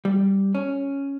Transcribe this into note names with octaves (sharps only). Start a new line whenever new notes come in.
G3
C#4